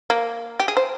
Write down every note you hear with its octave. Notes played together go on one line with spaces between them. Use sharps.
A#3
G4
G#4
C5